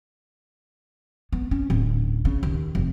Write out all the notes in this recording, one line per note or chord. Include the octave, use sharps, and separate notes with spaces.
B3
C#4
D1
C#3
D#2
F1